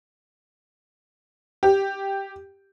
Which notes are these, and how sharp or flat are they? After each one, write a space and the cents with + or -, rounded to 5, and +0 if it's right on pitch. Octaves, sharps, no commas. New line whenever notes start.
G4 +0